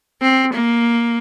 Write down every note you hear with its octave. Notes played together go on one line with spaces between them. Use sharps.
C4
A#3